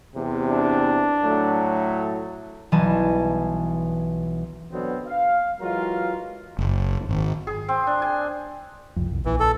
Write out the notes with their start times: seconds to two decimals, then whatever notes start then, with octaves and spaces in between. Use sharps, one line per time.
0.15 E2 C3
0.50 D4
1.23 A2 F#3 A3
2.72 B1 E3 G3 G#5 A5
4.72 B2 D3 F#3 B3 C4
5.08 F5
5.61 E3 F#3 G#3 F4 A#4
6.59 F#1
7.09 G#1
7.47 G#4
7.69 C4
7.87 D4
8.02 G#5
8.96 C2 F2
9.11 C2
9.25 A#1 E3
9.40 A4